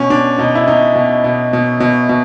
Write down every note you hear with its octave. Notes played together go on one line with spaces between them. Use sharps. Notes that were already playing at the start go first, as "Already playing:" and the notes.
Already playing: B2 C#4
B2 D4
B2 D#4
E4
B2 D#4
B2
B2
B2
B2
B2